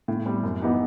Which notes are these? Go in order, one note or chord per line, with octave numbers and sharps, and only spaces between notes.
A2
G3 C4
F#2
E3 B3 D#4 G4